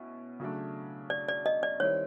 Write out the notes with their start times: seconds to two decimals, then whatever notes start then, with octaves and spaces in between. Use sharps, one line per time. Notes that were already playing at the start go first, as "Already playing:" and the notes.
Already playing: B2 C#4 E4
0.40 C#3 F#3 A3 D4
1.10 D5
1.28 D5
1.46 D#5
1.63 D5
1.80 D#3 G3 C4 E4 C#5